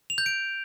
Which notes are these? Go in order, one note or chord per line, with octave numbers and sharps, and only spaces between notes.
F7
G6
D7